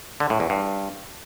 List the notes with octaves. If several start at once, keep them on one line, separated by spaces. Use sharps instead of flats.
D3
A2
E2
G2